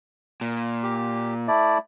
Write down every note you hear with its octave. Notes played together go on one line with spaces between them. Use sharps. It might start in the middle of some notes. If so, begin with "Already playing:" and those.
A#2
G4
A3 E4 D5